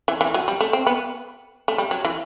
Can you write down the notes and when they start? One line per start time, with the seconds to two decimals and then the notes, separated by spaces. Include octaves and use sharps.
0.08 E3
0.21 E3
0.34 F#3
0.48 G3
0.61 A3
0.73 C4
0.87 B3
1.68 A3
1.78 G3
1.91 F#3
2.05 E3